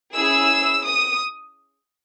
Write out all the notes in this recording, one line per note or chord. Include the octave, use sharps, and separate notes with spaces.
C#4 E4 G#4 E6
D#6